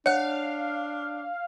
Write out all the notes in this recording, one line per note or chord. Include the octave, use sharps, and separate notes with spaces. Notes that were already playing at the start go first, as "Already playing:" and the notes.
D4 C#5 F5 F#5 F#6